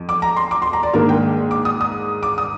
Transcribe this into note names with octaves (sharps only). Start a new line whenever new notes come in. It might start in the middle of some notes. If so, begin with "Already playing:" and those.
Already playing: F2
D6
A#5
C6
D6
C6
A#5
D5
G#2 D#3 A#3 D4 A#4
G5
D6
D#6
D#6
D6
D#6